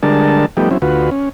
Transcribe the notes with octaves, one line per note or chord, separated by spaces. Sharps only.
D3 G3 G#3 D4 A#4 A5
F3 G3 A3 B3 D#4 G4
F#3 C4 C#4 E4
D2 F4 F#4 B4
C#4